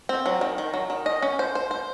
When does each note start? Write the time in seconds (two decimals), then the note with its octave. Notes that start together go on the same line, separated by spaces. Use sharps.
0.09 C4
0.26 F#3
0.41 D#3
0.58 D#3
0.74 F#3
0.90 D#3
1.06 D#5
1.22 C#4
1.39 C5
1.55 C5
1.71 C5